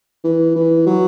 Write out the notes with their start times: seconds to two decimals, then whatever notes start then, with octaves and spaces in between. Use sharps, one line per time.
0.24 E3
0.56 E3
0.86 F#3